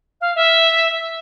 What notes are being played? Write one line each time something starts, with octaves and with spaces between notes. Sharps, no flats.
F5
E5